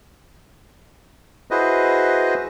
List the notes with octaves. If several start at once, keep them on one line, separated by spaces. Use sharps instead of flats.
E4 F#4 G#4 B4 C5 D#5